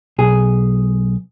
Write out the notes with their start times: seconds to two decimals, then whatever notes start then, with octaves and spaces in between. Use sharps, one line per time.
0.18 B1 G#4